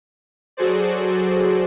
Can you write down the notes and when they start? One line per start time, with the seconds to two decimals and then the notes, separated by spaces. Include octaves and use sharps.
0.57 F#3 F#4 G#4 A4 C5 D5